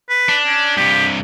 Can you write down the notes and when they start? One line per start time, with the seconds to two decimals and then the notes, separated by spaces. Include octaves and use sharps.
0.09 B4
0.29 D4
0.47 C#4
0.77 G2 C3 G4